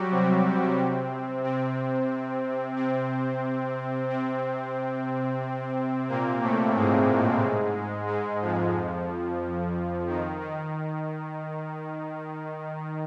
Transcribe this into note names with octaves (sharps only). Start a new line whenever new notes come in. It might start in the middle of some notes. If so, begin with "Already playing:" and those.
Already playing: F#3 G3 F#4 G4
C3 C4
C3 C4
C3 C4
C3 C4
A#2 A#3
A2 A3
G#2 G#3
G#2 G#3
F2 F3
D#3
D#3